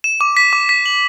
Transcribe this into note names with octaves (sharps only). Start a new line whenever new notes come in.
E7
D6
B6
D6
B6
F#7